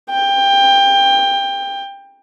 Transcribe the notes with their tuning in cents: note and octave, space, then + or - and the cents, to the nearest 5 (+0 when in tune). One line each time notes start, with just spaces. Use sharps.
G5 +20